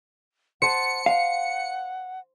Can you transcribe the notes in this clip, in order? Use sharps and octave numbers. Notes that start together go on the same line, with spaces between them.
C5 F#5 A5 C#7 D#7
F5 F#5